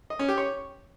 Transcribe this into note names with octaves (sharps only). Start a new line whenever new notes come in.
D#5
C#4
G4
C#5